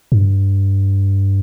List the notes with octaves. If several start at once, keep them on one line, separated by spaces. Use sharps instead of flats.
G2